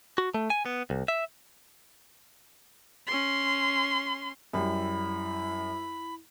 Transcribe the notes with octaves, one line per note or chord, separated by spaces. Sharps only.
F#4
A3
G#5
B3
C2
E5
C#4 C6
F#2 G3 E4 B5